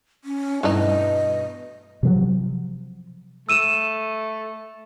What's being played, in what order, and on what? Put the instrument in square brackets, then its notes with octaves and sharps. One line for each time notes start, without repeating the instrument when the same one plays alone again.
[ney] C#4
[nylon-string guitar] G2 B2 [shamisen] E3 A3 D#4 [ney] D#5
[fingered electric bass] C3 F3 F#3
[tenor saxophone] A3 [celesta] E6 D#7 E7